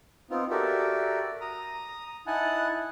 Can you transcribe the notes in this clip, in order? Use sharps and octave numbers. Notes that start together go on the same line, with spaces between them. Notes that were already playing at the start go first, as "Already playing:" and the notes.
B3 C4 D#4 F4
F#4 G4 A4 A#4 D5 E5
A#5 D#6
D#4 E4 F#5 G#5 A5 F#6